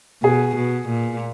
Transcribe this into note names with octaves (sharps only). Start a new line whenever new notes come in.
B2 G#4
B2
A#2